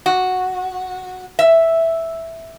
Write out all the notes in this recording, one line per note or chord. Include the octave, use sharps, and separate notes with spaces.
F#4
E5